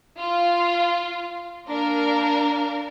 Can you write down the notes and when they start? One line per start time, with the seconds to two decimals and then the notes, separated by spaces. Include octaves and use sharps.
0.18 F4
1.67 A#3 D4 A#4